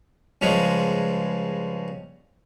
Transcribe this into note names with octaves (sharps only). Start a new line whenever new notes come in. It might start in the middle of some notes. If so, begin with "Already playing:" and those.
G2 C#3 F3 G#3